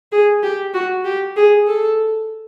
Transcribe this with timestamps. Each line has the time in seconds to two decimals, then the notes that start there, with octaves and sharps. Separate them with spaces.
0.12 G#4
0.43 G4
0.74 F#4
1.05 G4
1.36 G#4
1.67 A4